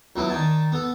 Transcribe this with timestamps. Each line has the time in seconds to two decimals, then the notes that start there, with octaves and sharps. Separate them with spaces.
0.16 C#2 F#3 B3 E4
0.29 D#3 D5 G#5 A5
0.72 B3 A4